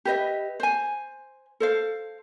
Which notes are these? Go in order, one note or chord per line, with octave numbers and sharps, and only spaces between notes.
G4 B4 D#5 E5
C5 G#5
A4 C5 F5